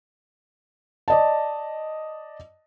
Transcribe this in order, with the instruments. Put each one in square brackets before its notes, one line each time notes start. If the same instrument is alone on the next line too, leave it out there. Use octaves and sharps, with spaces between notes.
[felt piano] D5 D#5 A5